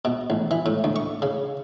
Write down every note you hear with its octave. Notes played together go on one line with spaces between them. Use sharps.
B2
A1
E3
A2
D2
C#6
C#3